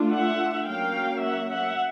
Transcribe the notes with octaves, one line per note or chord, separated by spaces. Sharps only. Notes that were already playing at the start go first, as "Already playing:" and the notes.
Already playing: A3 D4 F4
E5 F#5
F#3 A#3 C#4 F5 G5
E5 F#5
E5 F#5